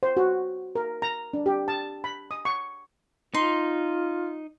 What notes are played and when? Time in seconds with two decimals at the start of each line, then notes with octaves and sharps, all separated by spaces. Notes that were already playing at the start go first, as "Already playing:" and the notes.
0.03 C5
0.17 F#4
0.75 A#4
1.02 A#5
1.34 D4
1.46 G4
1.68 A5
2.04 B5
2.31 D#6
2.45 C#6
3.34 D#4 F4 C6